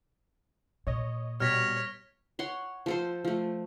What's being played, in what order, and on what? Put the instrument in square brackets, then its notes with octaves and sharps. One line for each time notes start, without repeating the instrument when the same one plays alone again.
[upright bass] A#2 [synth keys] C#5 D#5
[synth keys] B2 G3 [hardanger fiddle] C#5 [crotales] F6 A#6 B6
[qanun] C#5 F#5 C6
F3 A4 C5
F3 A3